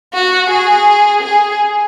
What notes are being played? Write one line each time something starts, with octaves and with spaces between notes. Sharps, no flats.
F#4
G#4
G#4